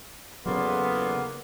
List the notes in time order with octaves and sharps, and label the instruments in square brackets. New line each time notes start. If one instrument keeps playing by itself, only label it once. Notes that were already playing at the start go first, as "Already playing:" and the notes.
[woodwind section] E2 A4 C6 [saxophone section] G#2 A#3 [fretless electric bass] C#3 F#3 [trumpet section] B3